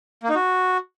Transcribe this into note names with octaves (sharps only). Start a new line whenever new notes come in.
A#3
D#4
F#4